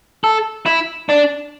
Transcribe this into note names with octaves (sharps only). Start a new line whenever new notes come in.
A4
E4
D4